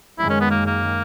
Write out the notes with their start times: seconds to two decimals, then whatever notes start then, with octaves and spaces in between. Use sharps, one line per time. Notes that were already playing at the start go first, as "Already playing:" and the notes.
0.19 F#2 D#3 G#3 E4
0.30 C#4
0.41 B3
0.51 A#3
0.66 A#3